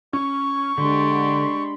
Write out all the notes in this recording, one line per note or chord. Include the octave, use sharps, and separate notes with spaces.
C#4 C#6
D3 G#3 D4 G4 B5 C6